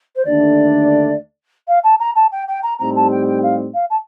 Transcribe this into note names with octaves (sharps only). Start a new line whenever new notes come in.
C5
D#2 D3 A3 D4 D5
F5
A5
A#5
A5
G5
G5
A#5
A2 G3 C4 D#4 G4 A#5
A5
G5
G5
F5
F5
A5